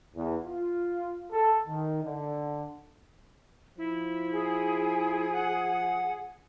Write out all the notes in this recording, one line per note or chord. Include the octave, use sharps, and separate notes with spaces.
E2
F4
A4
D#3
D3
F3 E4
G#4
F#5